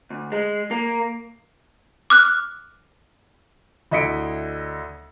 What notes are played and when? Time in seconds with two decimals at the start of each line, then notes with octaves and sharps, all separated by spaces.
0.10 D2
0.32 G#3
0.71 A#3
2.10 D6 F6 F#6
3.91 D2 E4 D#5 B6 C#7 D7